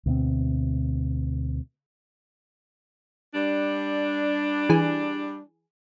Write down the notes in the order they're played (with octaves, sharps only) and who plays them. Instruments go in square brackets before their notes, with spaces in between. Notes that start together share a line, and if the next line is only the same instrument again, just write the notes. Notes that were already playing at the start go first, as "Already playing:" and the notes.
[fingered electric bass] D2 B2 G3 C4
[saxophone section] G3 D4
[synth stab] E3 G#4